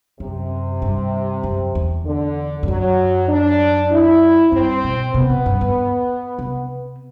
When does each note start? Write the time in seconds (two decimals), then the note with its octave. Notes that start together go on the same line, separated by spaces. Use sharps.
0.20 F#2 C3
0.82 G2
1.43 F#2
1.75 E2
2.05 D3
2.63 G2
2.67 F#2 F#3
3.29 D4
3.91 E4
4.52 G2 C4
4.84 B2
5.15 C3 B3
5.30 B2
5.46 G2
5.61 E2
6.39 C3